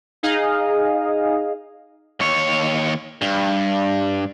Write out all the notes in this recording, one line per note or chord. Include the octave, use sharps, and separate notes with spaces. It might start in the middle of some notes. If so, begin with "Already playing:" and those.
D#4 G#4 D#5 F5
D#2 C#5
G2